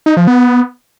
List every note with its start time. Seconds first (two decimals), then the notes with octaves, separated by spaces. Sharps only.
0.06 D#4
0.17 F3
0.27 B3